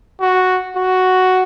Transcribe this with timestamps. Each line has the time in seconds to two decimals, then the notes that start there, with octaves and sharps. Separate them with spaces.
0.20 F#4
0.76 F#4